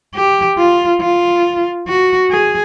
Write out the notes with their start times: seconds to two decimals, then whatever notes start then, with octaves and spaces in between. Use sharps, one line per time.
0.15 G4
0.58 F4
1.01 F4
1.87 F#4
2.31 G#4